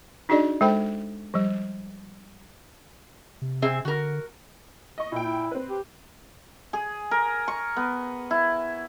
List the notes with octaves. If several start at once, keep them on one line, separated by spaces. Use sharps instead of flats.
D4 D#4 F#4 G#4 D5 D#5
G#3 A4 C5 G5 B5
F3 G3
C3
C4 G#4 E5
D3 F#4 A#4
D#5 C#6
A#2 E4 G5
E4
C4 B4
G4
G#4
A#4
C#6
B3
E4